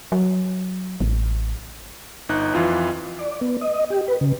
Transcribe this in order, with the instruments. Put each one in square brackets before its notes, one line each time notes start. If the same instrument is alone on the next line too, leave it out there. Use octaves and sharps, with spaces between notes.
[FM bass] F#3
A1
[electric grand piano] G1 D#4 F#6
F2 E3 F4
[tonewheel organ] D5
B3
D#5
G4
B4
C#3